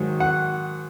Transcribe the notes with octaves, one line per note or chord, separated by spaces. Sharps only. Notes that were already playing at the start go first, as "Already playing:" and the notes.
Already playing: G#2 D#3 F#3
F#5